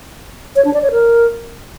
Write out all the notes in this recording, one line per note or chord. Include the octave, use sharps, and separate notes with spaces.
C#5
D4
D5
C#5
A#4